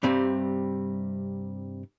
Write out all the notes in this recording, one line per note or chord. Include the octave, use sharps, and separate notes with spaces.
G2 C3 G3 C4